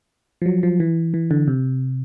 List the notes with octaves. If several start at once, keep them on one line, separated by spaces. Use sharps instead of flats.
F3
F#3
F3
E3
E3
D3
C3